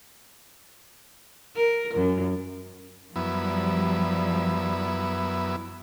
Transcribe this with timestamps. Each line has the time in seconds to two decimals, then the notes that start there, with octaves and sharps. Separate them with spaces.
1.56 A#4
1.95 F#2
3.16 F#2 F3 G3 B3 E4